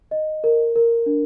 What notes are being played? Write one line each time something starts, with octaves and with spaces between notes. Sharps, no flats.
D#5
A#4
A#4
D4